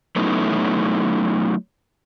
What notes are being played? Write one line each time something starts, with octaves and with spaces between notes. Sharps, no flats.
F#3 A3 B3 C#4 D#4 E4